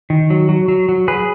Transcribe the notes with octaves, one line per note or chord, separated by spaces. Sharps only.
D#3
F#3
F#3
F#3
F#3
F#3 G#4 B4